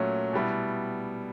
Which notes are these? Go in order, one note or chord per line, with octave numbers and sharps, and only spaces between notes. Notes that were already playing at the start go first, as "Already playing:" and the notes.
Already playing: A#2 F#3 A3 C#4
B2 G3 B3 E4